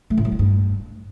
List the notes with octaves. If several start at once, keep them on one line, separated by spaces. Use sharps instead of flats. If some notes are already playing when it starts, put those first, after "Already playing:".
A3
A2
F#3
G#3
G2